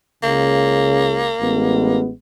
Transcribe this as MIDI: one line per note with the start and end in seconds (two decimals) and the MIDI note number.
0.23 1.30 37
0.23 1.30 49
0.23 1.98 58
1.39 2.11 33
1.39 2.11 56
1.39 2.11 59